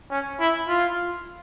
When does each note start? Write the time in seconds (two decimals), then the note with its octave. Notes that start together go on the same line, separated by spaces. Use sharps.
0.10 C#4
0.39 E4
0.68 F4